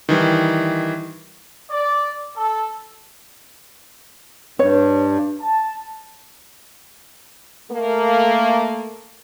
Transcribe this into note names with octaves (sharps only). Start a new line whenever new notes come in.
D#3 E3 G3
D5
A4
G2 C#5
A5
A3 A#3